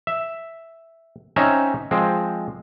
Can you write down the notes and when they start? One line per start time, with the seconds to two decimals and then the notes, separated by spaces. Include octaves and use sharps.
0.07 E5
1.36 C4 C#4 D#4 E5 A#5
1.91 F3 G#3 C4